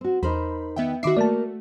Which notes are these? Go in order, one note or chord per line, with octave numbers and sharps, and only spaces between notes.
C4 F#4
E2 D#4 A#4 C5 B5
D#3 B3 E5 G5
D#3 D#4 F#4 E5 D6 C7
A3 A#3 F#4 D5 A5